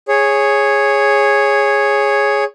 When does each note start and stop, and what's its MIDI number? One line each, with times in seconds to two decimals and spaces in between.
0.08 2.44 68
0.08 2.44 73